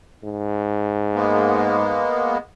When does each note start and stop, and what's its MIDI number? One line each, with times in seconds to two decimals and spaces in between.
0.24 2.01 44
1.15 2.38 56
1.15 2.38 58
1.15 2.38 59